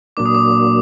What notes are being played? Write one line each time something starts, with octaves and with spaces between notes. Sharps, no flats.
A#2 F#3 A#3 D4 D6
D#6
D6